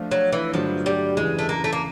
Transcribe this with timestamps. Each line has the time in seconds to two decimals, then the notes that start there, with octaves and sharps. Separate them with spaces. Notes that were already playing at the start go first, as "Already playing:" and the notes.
Already playing: F3 A3 D4 F4
0.11 F#3
0.33 E3
0.53 G2 D3 F3 F#3 A3 D4
0.86 G3
1.17 E2 C#3 E3 G#3
1.39 A3
1.49 A#3
1.64 A3
1.73 A#3